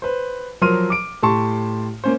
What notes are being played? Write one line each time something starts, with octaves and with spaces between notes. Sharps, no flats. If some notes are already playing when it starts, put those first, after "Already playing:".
B4 C5
F3 F#3 A#4 C6 F6 D#7
D6 D7
A2 G4 A5 C6 C#6
A#3 C#4 C5